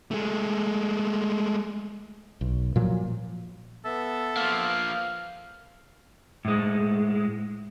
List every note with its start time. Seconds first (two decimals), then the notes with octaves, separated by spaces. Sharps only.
0.11 G#3 A3
2.41 B1
2.76 A#2 F3 F#3
3.85 B3 A4 E5
4.37 F3 A#3 F5
6.45 A2 G#3